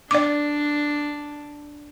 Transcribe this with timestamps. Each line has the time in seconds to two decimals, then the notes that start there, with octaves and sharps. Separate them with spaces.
0.11 D4 D5 D6